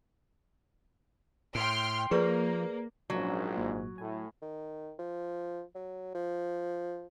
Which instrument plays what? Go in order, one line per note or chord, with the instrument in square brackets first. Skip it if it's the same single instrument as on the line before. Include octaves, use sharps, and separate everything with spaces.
[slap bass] A2 [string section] G5 C6 F6 [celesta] D7
[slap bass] F3 [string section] A#3 [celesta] G#4 B4 D5
[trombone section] A#1 G#2 [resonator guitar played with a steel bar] F#3 [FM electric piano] C#4 D4
[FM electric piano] G#1 A#2
[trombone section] A2 [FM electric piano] G#5
[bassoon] D#3
F3
F#3
F3